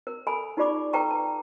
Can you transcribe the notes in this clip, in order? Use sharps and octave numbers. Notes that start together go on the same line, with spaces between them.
A#4
A4 G#5 B5
D#4 F4 G4 D5 B5 D6
A4 B4 G5 A5 A#5 C#6
A5